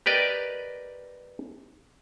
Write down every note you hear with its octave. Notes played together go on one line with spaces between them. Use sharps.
G4 A#4 B4 D5 D#5